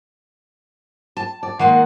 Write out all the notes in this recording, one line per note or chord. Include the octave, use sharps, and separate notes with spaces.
A5
D5
D#3 G#3 A#3 F#5